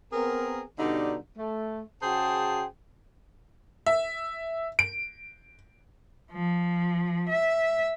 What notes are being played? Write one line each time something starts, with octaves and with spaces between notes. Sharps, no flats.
B3 C4 G#4 A#4
G2 B2 D3 G3 D#4
A3
C#3 F#4 G#4 C5 G5 A5
E5
D7
F3
E5